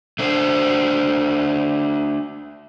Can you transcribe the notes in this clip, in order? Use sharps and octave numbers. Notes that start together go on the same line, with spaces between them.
A3 D4 C5